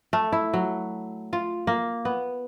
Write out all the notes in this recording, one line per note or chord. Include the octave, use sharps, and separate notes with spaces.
A3
E4
F#3
F4
A#3
B3